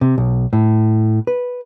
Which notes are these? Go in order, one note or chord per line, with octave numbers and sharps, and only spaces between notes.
C3
B1
A2
B4